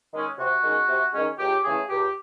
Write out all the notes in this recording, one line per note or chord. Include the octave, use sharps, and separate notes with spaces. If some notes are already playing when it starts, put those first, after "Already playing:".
D#3 G#3 C#4
C3 F#4
D#3 G#3 C#4
C3
D#3 G#3 C#4
C#2 G4
C#3 E3 A3 G#4
C#2 G4